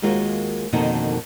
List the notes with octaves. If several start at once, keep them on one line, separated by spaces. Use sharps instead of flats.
D#2 G#3 A#3 F4 F#4
F2 B2 D3 D#3 A#3 D#4